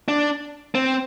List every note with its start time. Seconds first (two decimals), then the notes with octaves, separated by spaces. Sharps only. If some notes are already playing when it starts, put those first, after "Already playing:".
0.08 D4
0.75 C4